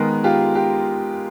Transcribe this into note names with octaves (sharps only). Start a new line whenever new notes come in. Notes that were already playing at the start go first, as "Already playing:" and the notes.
Already playing: D#3 G#3 B3 G#4 A#4
F4 G4
G4